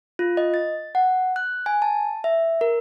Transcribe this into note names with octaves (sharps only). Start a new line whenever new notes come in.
F4
D#5
A6
F#5
F#6
G#5
A5
E5
A#4